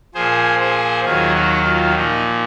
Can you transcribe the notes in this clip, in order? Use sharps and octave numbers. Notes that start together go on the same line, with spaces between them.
A#2 F3 G#4 C5
G#4 C5
D#2 D#3 F#3 F4 G#4
D#4 F#4
F4
A#2 F3 D#4